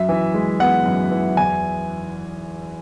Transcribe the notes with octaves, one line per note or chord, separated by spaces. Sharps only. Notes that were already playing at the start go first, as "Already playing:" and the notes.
Already playing: F#2 E5
E3
G#3
B3 F#5
F#2
E3
E2 G#5